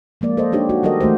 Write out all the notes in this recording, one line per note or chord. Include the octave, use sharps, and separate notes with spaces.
F3 G#3 A#3 D5
A4 C5 D#5
D4 D#4 G4 C5 C#5
D#4 F#4
D#3 G3 G4 A4 A#4 D#5
E3 A3 F#4 C5